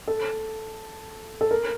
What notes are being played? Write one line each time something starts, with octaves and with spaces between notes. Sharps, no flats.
A4
A4
A#4